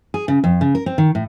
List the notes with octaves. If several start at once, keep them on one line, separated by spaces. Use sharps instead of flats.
G#4
C#3
F2
C#3
A#4
C4
D#3
A2